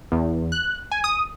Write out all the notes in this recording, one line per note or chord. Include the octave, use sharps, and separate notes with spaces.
E2
F#6
G#5
D#6